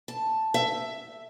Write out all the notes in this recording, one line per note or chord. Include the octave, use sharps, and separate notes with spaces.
A5
E5